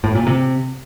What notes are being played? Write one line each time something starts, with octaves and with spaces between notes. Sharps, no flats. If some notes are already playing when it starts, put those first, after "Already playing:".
A2
A#2
C3